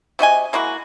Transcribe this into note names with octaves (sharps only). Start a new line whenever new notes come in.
C3 F#4 D#5 G#5
G#3 A#3 E4 F#4